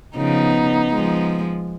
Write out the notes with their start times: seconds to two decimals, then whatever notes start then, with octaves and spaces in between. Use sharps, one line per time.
0.16 C#3 F3 B3 D#4
0.92 F3 G#3